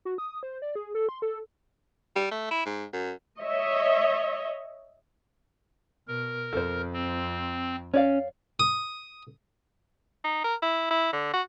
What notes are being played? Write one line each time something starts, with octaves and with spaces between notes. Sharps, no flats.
F#4
D#6
C5
D5
G#4
A4
C6
A4
G3
A3
E4
G#2
F#2
C#5 D#5 E5
B2 A#4
F2 A4 C5
C4
C#4 C#5 D5 F5
D#6
D#4
A#4
E4
E4
D3
F#4